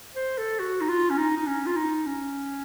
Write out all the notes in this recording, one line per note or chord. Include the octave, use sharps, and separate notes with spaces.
C5
A4
F#4
D#4
F4
C#4
D#4
D#4
C#4
F4
D#4
C#4